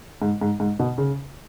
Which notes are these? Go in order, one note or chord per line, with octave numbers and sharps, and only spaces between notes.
G#2
G#2
G#2
B2
C#3